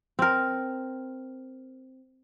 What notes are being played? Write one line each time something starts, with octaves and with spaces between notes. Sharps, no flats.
C4 A#4